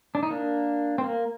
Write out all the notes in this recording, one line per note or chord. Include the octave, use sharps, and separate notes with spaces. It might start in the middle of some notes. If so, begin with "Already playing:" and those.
D4
D#4
A#3 D4
C4
A#3